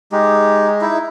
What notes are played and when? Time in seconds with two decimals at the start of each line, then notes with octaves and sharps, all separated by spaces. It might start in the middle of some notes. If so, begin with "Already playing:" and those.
0.12 G#3 D#4 G4
0.81 D#4 E4